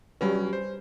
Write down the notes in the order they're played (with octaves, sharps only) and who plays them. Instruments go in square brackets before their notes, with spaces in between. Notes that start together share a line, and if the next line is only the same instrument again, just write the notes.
[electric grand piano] F#3 C#4 [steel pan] G3 B4
[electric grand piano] C5